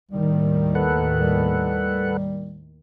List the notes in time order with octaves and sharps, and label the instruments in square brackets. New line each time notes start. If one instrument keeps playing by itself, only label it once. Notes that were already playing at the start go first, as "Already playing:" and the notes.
[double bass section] D#2 A2 D#3 [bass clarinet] G3
[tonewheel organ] A4 B4 F#5
[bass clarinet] G3